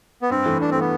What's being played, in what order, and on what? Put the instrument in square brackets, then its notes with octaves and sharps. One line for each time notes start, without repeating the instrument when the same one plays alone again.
[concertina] B3
[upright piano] G2 [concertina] C4
[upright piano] E3 A3
[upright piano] G2 [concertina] D4
[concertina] C4
[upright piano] E3 A3 [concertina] B3